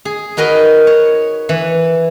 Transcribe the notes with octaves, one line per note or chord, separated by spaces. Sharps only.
G#4
D#4 F#4 A#4 B4 D#5
C#5
E3